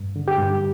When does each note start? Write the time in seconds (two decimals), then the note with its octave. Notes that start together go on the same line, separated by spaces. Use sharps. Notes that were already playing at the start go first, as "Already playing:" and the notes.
Already playing: G2
0.16 D3
0.28 G4
0.38 G2